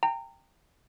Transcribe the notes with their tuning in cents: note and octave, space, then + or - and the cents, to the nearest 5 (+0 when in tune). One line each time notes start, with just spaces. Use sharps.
G5 +10 A#5 -25